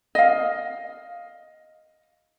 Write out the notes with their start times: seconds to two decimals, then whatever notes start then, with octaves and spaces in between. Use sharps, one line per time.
0.15 D#5 F5